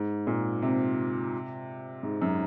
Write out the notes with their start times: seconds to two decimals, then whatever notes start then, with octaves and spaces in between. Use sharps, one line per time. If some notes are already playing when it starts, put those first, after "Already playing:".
Already playing: G#2
0.27 A#2
0.62 C3
2.03 G#2
2.22 F#2